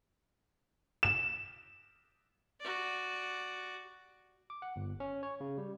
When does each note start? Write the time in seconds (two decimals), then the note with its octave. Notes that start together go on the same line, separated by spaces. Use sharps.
1.03 E7
2.60 F#4 D5
4.50 D6
4.62 F#5
4.76 G1
5.00 C#4
5.23 C#5
5.41 C#3
5.58 G3